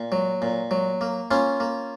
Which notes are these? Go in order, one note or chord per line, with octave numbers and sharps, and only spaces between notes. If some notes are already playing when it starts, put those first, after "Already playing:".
Already playing: A#2
F#3
A#2
F#3
A#3
A#3 C#4 F4
A#3